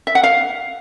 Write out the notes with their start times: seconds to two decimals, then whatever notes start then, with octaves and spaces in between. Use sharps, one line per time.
0.07 E5
0.15 F#5
0.23 F5